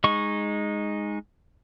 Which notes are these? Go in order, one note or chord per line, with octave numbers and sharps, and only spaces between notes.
G#3 D#4 C#6